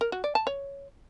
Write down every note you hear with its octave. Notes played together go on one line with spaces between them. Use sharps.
A#4
F#4
D5
A5
C#5